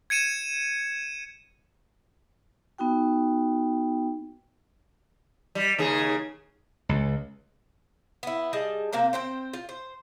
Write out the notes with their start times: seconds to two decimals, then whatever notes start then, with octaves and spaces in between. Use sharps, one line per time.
0.10 G#6 C#7 D#7 E7
2.78 B3 D#4 F#4 G5
5.55 G3
5.79 D#2 C#3 D#4 G#4
6.89 C#2
8.23 B3 E4
8.53 G3 G#4 D#5 A5
8.93 C3 A#3 C4 F5
9.13 C4 C5 G5
9.53 F4
9.69 C5